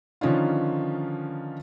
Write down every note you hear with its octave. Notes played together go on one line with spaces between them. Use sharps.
D3 D#3 F3 C#4 D#4 F4